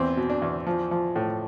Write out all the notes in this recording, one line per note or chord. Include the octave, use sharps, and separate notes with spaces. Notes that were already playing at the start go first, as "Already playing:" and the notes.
Already playing: E2 C4
B2
D4
E2
F3
F3
A2